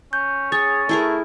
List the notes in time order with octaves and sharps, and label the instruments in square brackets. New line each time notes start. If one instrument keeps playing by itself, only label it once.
[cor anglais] C#4 [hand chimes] G6
[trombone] G#4 [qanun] C#5 [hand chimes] A6
[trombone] A3 [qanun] E4 G#4 A#4